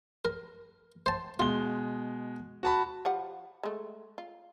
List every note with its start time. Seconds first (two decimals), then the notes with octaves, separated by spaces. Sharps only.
0.25 A#4
1.06 C5 A5
1.39 B2 G#3 F4 G7
2.63 F#4 A5 B5
3.05 F3 G4 F#5
3.63 G#3 A3
4.18 F4